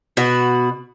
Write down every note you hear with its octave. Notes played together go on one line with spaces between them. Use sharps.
B2 F#4